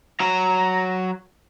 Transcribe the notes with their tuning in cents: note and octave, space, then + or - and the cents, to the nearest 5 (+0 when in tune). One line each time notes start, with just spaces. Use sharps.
F#3 +0 A#5 -5